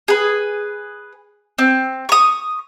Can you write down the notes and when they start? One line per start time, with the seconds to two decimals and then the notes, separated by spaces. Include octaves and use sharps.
0.08 G#4 B4
1.58 C4
2.09 C#6 D#6